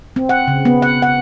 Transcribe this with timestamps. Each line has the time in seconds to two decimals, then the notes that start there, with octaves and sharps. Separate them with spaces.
0.16 C4
0.29 F#5
0.48 C#3
0.65 B3
0.82 F#5
1.02 F#5